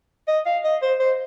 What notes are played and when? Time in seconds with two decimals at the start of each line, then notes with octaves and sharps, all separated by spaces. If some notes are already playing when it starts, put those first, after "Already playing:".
0.28 D#5
0.46 F5
0.64 D#5
0.82 C5
1.00 C5